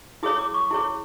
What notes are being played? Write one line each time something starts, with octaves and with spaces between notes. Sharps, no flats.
E4 G#4 C#5 D#6
D6
C#6
E4 G#4 C#5